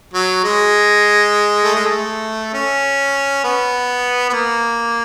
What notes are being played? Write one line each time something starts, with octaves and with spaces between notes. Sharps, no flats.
F#3
G#3
A3
G#3
A3
C#4
B3
B3
A#3